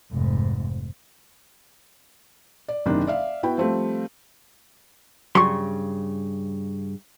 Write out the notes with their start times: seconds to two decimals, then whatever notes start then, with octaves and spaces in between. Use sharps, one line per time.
0.11 F1 G#2
2.68 D5
2.86 F#1 C3 D#3 D4
3.07 D5 E5 F5
3.43 B3 E4 F#4 G5 B5
3.58 F3 G3 A3 C4
5.35 G2 C#3 F#3 C6 C#6